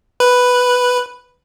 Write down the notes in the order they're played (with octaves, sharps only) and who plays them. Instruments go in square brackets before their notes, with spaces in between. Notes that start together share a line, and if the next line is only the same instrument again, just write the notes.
[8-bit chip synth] B4